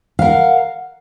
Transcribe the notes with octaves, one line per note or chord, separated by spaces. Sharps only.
A#4 F5 F#5